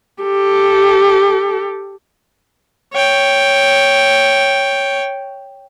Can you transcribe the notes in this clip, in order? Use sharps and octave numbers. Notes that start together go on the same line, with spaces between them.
G4 A4
C#5 G5